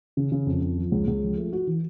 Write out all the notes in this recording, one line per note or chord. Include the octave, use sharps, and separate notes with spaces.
C#3
C#3
F2
F2
F3
C#2
C#2
F3
A3
F#4
E3